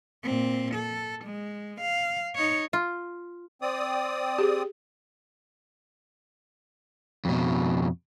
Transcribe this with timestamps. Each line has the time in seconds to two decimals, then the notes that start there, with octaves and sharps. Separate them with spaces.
0.23 A#2 C4
0.75 A4
1.25 G#3
1.81 F5
2.35 D#4 C#5
2.73 F4
3.62 C4 D5 D#6
4.39 G4 G#4
7.25 F2 B2